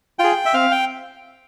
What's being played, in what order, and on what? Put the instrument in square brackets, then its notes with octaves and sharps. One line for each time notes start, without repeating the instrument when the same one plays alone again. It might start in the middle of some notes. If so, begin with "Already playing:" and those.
[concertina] F4 G#4 G5
E5
C4 F5
G5